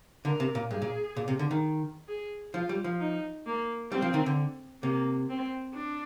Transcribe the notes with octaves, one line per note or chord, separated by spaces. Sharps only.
D3 A#4
C3
A#2
G2 G#4
A#2
A#2
C3
D3
D#3
G#4
F3 F4
G3
F3
D#4
A#3
G3 C4
F3
D#3
D3
C3 A#3
C4
D4